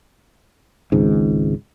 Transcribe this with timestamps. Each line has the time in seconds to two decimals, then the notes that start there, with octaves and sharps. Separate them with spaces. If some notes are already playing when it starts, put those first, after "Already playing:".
0.92 G#1 C#2 G#2